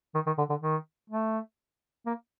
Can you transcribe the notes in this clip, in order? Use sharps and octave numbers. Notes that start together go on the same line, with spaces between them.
D#3
D#3
D3
D3
D#3
A3
A#3